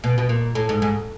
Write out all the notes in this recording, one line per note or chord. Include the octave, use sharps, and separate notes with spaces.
B2
B2
A#2
A2
G#2
G#2